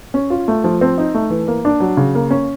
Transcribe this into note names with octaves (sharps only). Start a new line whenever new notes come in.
C#4
F4
A3
F3
C4
D#4
A3
E3
A#3
D4
F#3
C#3
A#3
C#4